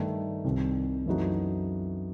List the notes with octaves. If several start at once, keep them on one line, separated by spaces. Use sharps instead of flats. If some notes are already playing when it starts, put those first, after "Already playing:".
Already playing: G2 D#3 A3
C2 C3 D#3
F#2 E3 A3 D#4 F#4